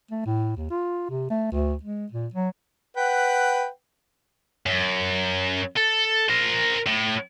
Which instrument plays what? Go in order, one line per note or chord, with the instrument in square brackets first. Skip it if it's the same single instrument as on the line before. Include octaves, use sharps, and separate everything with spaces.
[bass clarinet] A3
A2
D#2
F4
C3
A3
D2
G#3
A#2
F#3
[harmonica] B4 F#5 G5
[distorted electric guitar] F#2
A4
A#4 C5
A2